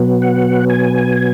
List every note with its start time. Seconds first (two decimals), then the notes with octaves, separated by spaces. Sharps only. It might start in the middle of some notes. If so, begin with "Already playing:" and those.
Already playing: B2 F#3 B3
0.22 F#5
0.70 G#5